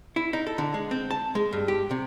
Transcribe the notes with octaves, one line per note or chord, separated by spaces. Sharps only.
E4
D#4
A4
D3
G#3
C4
A5
G#3
G2
G4
C3